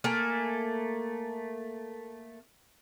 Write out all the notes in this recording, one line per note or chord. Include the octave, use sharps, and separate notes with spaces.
A3 A#3 G#5